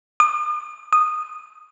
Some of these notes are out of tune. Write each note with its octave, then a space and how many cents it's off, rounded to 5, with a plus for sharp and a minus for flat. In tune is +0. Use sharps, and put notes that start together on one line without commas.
D#6 -45
D#6 -15